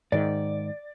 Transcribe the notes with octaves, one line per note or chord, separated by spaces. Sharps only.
G#2 D#3 D5